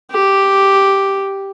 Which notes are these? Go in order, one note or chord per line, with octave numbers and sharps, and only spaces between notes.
G4